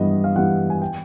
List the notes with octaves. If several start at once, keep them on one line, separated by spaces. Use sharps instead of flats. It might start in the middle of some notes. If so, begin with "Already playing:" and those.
Already playing: G2 E3 G3 B3 D#5
F5
E3 G3 B3 F#5
G#5
G5